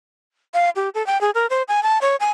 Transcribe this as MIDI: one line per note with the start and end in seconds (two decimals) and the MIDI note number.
0.54 0.70 77
0.76 0.89 67
0.95 1.05 69
1.07 1.20 79
1.21 1.31 68
1.35 1.46 70
1.50 1.63 72
1.68 1.83 80
1.83 1.99 81
2.01 2.16 73
2.20 2.30 80